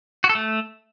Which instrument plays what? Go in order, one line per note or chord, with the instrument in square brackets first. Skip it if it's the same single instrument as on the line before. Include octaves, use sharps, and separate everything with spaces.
[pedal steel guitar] F#4
A4
A3